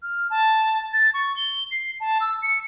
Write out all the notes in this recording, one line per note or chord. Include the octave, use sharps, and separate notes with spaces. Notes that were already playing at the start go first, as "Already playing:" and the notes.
F6
A5
A6
C#6
G7
C7
A5
E6
C#7